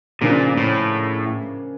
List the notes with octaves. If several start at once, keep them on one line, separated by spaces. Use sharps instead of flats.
A#2 C#3 F3 A#3 D4
A2